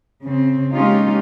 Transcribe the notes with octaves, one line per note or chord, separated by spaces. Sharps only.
C#3 C4
G#3 A#3 C#4 D#4 F4 G4